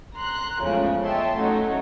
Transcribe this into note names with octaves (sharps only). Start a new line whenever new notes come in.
A#5 C6 F#6
E2 G#2 C#3 F3 A3
C#5 D#5 E5 G5 A5 C6
A2 F#3 A3 C#4 D#4